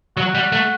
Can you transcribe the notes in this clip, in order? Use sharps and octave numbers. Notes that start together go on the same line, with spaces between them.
F#3 F#4
G3
A3